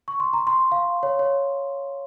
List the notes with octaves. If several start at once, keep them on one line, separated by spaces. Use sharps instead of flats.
C#6
C6
A#5
C6
F5
C#5
C#5